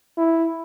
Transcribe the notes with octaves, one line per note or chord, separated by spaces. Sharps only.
E4